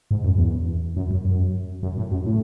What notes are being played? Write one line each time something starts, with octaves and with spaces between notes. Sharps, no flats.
G#2
F#2
E2
F#2
F#2
F#2
F#2
A2
F#2
A2